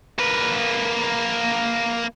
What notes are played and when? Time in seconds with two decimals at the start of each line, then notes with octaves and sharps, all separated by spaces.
0.19 A#3 B4